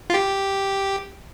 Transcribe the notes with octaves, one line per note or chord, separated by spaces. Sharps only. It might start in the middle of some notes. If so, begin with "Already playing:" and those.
F4
G4